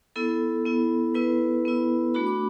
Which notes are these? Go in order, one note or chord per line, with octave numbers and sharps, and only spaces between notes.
B3 E4 A4
B3 E4
B3 E4 B4
B3 E4
A3 D4 F#4 B5
D6